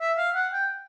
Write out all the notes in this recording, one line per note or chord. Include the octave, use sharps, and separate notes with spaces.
E5
F5
F#5
G5